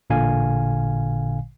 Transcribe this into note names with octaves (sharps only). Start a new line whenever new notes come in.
A1 A#2 D3 F5 G#5